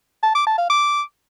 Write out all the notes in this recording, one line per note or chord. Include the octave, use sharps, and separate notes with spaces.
A5
D6
A5
F5
D6